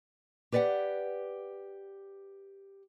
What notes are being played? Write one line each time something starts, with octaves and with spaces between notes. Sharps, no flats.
G4 B4 D5 E5 F#5